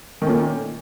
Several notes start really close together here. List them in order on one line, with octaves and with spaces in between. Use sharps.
D#3 A3 C#4 A#2